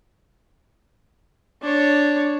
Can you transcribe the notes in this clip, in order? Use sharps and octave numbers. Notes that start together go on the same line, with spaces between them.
D4 C#5